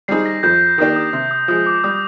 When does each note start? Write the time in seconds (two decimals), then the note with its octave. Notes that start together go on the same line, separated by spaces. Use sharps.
0.08 G3 C4 D#4 G#4 C7
0.26 A#6
0.43 F2 G6
0.78 D#3 A#3 D4 G4 D#6
0.96 D#6
1.13 C3
1.31 D#6
1.48 F3 G#3 D#6
1.66 D6
1.84 G3 D#6